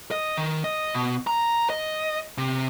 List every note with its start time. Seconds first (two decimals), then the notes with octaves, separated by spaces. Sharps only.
0.11 D#5
0.37 D#3
0.64 D#5
0.94 B2
1.27 A#5
1.70 D#5
2.38 C3